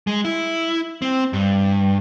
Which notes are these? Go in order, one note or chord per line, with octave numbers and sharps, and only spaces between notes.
G#3
E4
C4
G2